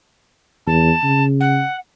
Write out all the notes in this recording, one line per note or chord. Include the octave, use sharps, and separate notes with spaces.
E2 A5
C#3
F#5